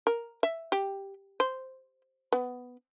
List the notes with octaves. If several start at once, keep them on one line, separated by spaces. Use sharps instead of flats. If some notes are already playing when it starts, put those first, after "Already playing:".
A#4
E5
G4
C5
B3